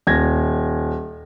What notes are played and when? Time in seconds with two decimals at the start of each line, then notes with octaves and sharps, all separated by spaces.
0.07 D#1 G#6 A#6